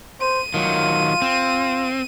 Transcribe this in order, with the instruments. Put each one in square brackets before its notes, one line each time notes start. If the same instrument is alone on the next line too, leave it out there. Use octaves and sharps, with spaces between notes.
[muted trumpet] C5 [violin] D#7
[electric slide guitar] D#3 F#3 [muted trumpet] F4
[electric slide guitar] C4